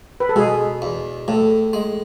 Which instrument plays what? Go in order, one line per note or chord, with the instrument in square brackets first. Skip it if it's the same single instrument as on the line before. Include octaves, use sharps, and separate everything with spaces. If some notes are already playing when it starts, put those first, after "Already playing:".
[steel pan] B4
A4
[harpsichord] B2 [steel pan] G#3 G#4
[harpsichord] E2
[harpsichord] A2 [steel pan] A3 A4
[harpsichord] G#3